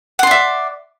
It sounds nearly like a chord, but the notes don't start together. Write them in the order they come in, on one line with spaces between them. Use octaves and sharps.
F#5 C6 D5 E5